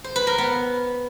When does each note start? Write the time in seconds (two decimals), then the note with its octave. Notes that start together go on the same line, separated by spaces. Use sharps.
0.04 C5
0.16 B4
0.27 A#4
0.38 B3